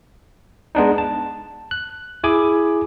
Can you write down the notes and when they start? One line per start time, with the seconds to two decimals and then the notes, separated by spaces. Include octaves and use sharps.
0.75 G#3 B3 D4 D#4
0.98 A5
1.71 F#6
2.24 E4 G#4 G#5 B5 D6